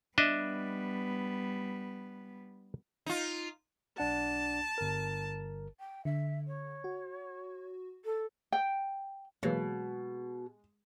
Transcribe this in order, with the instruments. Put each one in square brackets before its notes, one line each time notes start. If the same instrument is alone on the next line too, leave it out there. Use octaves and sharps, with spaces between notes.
[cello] G3 B3 [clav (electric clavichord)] D4 D#5 E5
[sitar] D#4 F4
[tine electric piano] B1 D4 F#5 [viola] A5
[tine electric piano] G1 A#4
[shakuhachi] G5
[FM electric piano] D3 [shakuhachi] E5
[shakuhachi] C#5
[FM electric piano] F#4
[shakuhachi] A4
[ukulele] G5
[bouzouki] B2 [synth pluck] E3 F#3 A#3 [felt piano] G#3